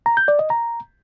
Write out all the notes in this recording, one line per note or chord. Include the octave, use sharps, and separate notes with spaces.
A#5
G6
D5
D#5
A#5